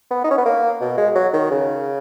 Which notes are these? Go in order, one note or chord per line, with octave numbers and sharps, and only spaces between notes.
B3
D#4
C#4
B3
A#3
B2
G#3
F#3
D#3
C#3